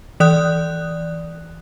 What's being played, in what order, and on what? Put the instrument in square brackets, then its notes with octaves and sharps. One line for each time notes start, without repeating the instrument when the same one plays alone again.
[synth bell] E3 D5 D#6 F#6